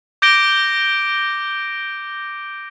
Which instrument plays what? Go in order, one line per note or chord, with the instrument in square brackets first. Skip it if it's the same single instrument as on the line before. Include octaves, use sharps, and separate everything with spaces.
[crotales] D6 G6 A#6 D7 G7